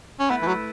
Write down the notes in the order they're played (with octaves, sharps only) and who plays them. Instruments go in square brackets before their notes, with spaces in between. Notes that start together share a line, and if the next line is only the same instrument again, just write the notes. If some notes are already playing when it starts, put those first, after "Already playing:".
[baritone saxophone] C#4
[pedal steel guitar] A3 E4 B4 [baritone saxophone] B3
[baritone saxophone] E3
F#3